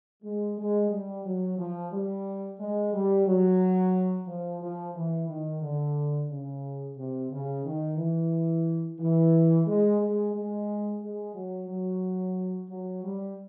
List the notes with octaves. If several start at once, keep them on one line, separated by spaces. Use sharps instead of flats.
G#3
G#3
G3
F#3
F3
G3
G#3
G3
F#3
F3
F3
E3
D#3
D3
C#3
C3
C#3
D#3
E3
E3
G#3
G#3
G#3
G#3
F#3
F#3
F#3
G3